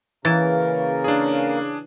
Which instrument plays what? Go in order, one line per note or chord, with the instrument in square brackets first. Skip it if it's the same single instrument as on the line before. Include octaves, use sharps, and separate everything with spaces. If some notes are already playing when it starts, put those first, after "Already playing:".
[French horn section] C#3 [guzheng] E3 [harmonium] A#3 A#4 [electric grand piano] A6
[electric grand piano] D4 G#4